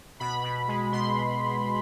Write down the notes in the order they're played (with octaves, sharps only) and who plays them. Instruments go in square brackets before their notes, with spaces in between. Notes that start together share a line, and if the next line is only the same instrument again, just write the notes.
[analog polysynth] B2 B5
B2
G#3
B2 C6